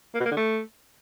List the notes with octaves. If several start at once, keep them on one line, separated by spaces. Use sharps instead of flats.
A#3
B2
A#3
D3
A3